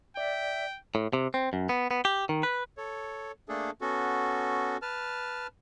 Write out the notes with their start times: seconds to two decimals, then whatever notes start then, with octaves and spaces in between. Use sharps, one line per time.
0.17 D5 E5 G5
0.95 A2
1.13 C3
1.34 C4
1.53 F#2
1.69 B3
1.91 B3
2.05 G4
2.29 D#3
2.43 B4
2.77 A4 C#5
3.49 A3 A#3 D4 G#4 A4
3.81 B3 C#4 F#4 A4
4.82 B4 A5 F6